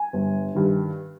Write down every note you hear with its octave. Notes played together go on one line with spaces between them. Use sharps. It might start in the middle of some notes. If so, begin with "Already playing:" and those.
Already playing: G#5
G1
G2 D#3